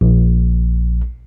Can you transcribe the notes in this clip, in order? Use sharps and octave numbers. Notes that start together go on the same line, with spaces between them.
A#1